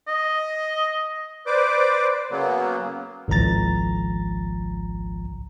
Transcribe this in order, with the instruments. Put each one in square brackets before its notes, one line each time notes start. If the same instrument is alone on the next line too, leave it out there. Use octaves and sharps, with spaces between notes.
[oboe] D#5
[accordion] B4 C5 D5 D6
C#3 F#3 A#3 B3
[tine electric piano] G#1 C#2 F3 A#5 A6